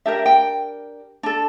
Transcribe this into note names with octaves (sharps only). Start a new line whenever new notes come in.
D4 G4 A#4 E5
G5
D4 A4